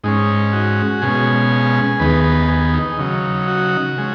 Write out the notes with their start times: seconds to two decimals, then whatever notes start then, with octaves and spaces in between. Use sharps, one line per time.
0.04 G#2 G#3 C#4 D#4
0.53 F#4
1.02 B2 G#3 C#4 G#4
2.00 D#2 D#3 B3 B4
2.24 B4
2.49 G#4
2.74 D#4
2.98 C#3 F#3 D#4
3.48 F#4
3.97 C#3 G#3